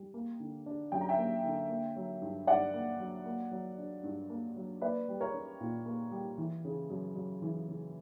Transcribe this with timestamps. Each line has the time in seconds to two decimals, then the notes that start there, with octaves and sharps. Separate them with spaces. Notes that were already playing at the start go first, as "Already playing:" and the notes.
Already playing: G3
0.14 A#3
0.40 D3
0.66 D4
0.92 F#2 G5
1.01 A#5
1.09 E5 G5
1.18 A#3
1.44 D3
1.69 A#3
1.96 F#3
2.21 G2
2.47 G2 D5 F#5
2.74 A#3
3.00 F#3
3.25 A#3
3.52 F#3
3.78 D4
4.03 G2
4.30 A#3
4.56 F#3
4.81 A#3 B4 D5
5.08 G3
5.20 A#4 C#5
5.34 C#4
5.61 A#2
5.86 A#3
6.11 G3
6.38 E3
6.65 C#3
6.90 F#2
7.16 F#2
7.42 E3
7.68 C#3